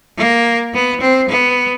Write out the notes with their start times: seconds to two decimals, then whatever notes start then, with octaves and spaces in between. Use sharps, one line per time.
0.17 A#3
0.74 B3
1.01 C4
1.29 B3